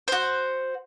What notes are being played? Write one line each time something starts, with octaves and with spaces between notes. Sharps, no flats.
F#4 C5